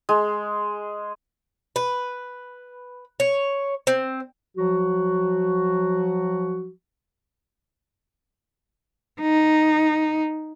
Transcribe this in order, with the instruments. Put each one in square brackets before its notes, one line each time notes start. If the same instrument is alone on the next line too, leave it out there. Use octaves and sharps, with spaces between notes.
[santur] G#3
[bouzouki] B4
C#5
C4
[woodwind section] F3 F#3 F#4
[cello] D#4